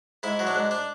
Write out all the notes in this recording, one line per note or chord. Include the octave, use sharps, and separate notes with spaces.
G#2 E4
F#3
D4
G#2
D4